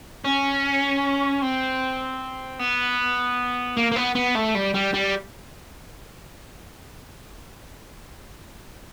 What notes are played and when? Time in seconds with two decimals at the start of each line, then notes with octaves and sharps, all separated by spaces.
0.25 C#4
1.42 C4
2.59 B3
3.77 A#3
3.92 A#3
3.96 B3
4.15 B3
4.35 A3
4.55 G3
4.74 G3
4.94 G3